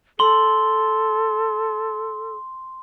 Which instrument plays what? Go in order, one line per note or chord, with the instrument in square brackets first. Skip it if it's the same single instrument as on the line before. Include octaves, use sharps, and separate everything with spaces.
[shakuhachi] A4 [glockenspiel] C6 G7